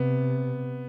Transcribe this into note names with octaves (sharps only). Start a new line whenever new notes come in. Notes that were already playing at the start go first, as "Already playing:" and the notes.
Already playing: C3 B3